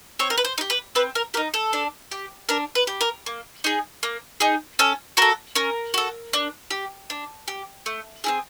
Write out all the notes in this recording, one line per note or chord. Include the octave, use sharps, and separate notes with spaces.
C4 C#5
A#4
B4
C5
D#4
G4
B4
C4 B4
A#4
G4 A#4
D#4
A4
D4
G4
D4 A#4
B4
G4
A#4
A#3
D#4 G#4
A#3
D#4 G#4
C#4 A4
F#4 A4 A#4
C#4 A#4
F#4 A4
D4
G4
D4
G4
A3
C4 E4 G#4